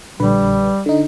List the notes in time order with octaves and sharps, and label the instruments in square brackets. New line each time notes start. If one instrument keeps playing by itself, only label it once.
[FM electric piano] A#1 D3 B4 [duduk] G3
[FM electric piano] D3 D#4